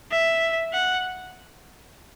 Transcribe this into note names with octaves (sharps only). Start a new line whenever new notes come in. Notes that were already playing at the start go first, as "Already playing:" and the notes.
E5
F#5